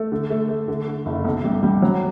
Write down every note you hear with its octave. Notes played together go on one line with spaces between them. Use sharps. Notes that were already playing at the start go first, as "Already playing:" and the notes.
Already playing: A3
D3
A3
A3
D3
D3
F#1
B1
G3
G3
F#3